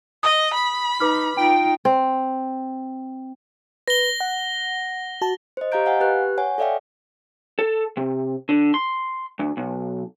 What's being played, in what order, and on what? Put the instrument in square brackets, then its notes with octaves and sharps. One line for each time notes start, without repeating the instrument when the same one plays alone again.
[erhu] D#5 [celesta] D#6
[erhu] B5
[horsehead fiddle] D#4 [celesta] B4 D6 F6
[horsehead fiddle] D#4 F4 [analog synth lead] G5
[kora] C4
[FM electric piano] B4 [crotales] A#6 G7
[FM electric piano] F#5
F#4 A5
[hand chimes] C5 D#5
G4 D#5 F5 A#5 G6 D7
F5 F#5 G#5
G4 B4 F#6
C#5 F#5 G#5
A4 C#5 D5 E5 F5 G5
[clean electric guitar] A4
C3
D3
C6
D2
B1